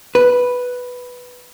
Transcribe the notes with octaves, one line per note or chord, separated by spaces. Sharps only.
B4